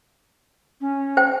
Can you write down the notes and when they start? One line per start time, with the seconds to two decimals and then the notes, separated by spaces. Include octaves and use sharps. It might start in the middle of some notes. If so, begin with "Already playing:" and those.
0.81 C#4
1.17 C5 G5